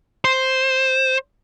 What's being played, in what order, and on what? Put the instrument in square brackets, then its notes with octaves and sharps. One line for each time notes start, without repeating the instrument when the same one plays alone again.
[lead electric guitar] C5